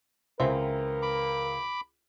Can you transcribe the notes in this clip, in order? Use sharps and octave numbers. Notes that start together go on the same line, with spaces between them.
C#2 E3 C4 A#4 E5
B5 D6